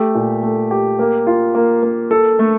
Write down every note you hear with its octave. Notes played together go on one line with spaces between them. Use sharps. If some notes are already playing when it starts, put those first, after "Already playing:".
Already playing: A3 G4
A#2
A3
G4
A#3
F4
A#3
A#3
A4
A3